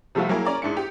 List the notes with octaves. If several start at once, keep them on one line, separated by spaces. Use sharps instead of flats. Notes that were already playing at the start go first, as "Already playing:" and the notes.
C3 F3 G3 A3 F4 F#4
F#3 A#3 E4 G#4 A#4
C#4 D5 A#5
G#2 D4 E4 C#7
G4